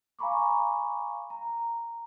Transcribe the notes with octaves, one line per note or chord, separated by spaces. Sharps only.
F5 G#5 A#5 B5 C#6 D6
A#5